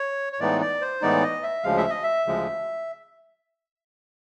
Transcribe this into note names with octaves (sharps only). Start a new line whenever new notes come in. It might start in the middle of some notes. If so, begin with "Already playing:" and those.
Already playing: C#5
C#5
A2 E3 G#3 B3 D#4 D5
D5
C5
A2 E3 G#3 B3 D#4 D5
D#5
E5
D2 C#3 F3 G#3 F5
E5
D#5
E5
D2 C#3 F3 G#3